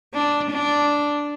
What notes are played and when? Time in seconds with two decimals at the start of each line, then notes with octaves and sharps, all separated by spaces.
0.14 D4
0.51 D4